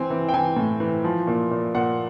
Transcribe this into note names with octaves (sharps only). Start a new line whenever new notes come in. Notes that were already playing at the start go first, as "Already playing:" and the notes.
Already playing: E3 C4 G#5
E3
G5
E3 G#5
A2
E3
F3
A#2
A#2
A#2 F#5